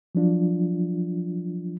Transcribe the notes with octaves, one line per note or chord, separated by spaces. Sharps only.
F3 F#3 D4 F4